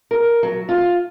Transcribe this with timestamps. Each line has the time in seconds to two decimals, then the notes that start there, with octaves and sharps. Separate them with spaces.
0.11 A#4
0.43 F#3
0.69 F4